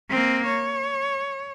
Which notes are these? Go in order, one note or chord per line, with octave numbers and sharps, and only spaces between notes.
A#3 C4
C#5